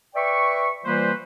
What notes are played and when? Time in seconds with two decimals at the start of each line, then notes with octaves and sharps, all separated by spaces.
0.16 B4 D5 E5 G5 C#6
0.84 E3 G3 A#3 F4 B4 C5